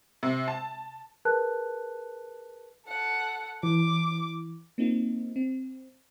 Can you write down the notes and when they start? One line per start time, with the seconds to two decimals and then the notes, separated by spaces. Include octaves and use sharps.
0.23 C3
0.48 A5
1.25 G#4 A#4 B4 A5 F#6
2.87 A4 F#5
3.63 E3 D6
4.78 A#3 C4 D#4 F4
5.36 C4